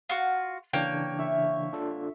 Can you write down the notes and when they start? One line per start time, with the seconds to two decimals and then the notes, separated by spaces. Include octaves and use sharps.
0.09 F4 F#4
0.73 C#3 E3 A#3 D4 C#5 G5
1.19 E5 C#6
1.73 D4 F4 A4